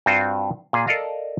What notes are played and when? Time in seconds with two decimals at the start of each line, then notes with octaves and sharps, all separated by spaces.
0.06 G2 C4 F4 F#4 C5
0.73 A#2 G#4
0.87 A4 A#4 D5 D#5 F5 A#5